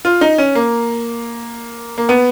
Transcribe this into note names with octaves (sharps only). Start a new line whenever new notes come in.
F4
D#4
C#4
A#3
A#3
B3